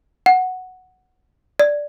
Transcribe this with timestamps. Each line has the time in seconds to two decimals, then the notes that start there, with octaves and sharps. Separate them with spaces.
0.26 F#5
1.59 D5